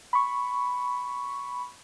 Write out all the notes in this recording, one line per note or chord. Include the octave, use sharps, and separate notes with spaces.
B5 C#6